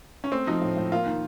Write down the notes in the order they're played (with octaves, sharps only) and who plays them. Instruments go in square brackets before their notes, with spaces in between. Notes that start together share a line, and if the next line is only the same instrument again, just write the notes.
[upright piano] C#4
[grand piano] A3 [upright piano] C4
[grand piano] F3 [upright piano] D#4
[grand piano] A2
A2
[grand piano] A#3 [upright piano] F4
[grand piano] D#3